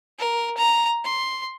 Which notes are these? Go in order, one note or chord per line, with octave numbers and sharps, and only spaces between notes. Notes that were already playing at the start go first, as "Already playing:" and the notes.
A#4
A#5
C6